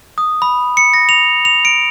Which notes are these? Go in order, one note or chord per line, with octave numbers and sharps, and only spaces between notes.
D#6
B5
C#7
A#6
F7
F7
D7